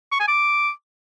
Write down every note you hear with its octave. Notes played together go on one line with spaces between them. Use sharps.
C#6
G#5
D6